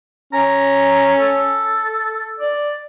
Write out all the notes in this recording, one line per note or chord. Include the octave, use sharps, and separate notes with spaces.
C#4 A#5
A4
D5